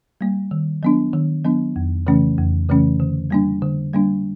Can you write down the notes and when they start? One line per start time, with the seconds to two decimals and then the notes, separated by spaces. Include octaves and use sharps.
0.21 G3 A#3
0.51 D#3
0.83 F#3 B3 D4
1.14 D#3
1.45 F#3 B3 D4
1.76 F2
2.07 C#3 E3 A3 C#4
2.38 F2
2.69 C#3 E3 A3 C#4
3.00 D3
3.30 G3 A#3 D4
3.62 D3
3.93 G3 A#3 D4